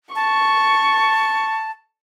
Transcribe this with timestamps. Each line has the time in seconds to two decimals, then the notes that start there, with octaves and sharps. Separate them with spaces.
0.15 A5 C#6